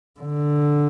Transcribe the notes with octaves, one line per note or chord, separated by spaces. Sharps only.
D3